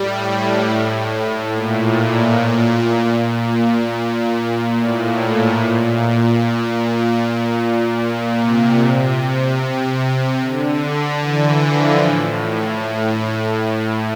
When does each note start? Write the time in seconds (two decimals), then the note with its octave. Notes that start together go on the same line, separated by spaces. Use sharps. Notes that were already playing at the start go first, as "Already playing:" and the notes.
Already playing: A2 G3
1.52 A#2
3.14 A#2
4.75 A2
5.56 A#2
5.96 A#2
7.98 A#2
8.38 C3
8.78 C3
9.59 C3
10.40 D3
11.20 E3
11.61 F3
12.01 A2